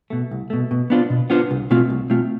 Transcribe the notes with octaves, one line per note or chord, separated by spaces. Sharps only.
B2 A3
C2
B2 A3
B2
B3 D4 F4 C5
B2
B3 D4 F4 C5
C2
B2 A3 C4 F4
C2
B2 A3 C4 F4